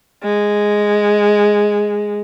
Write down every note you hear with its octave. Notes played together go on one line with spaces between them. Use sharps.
G#3